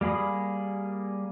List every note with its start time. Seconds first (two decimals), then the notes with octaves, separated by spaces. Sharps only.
0.01 G3 A#3 G#4 B5 D#6